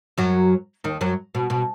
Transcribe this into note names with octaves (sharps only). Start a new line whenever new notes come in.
F#2 F#3
D#2 D#3
F#2 F#3
B2
B2